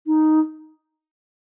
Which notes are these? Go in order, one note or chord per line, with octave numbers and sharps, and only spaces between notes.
D#4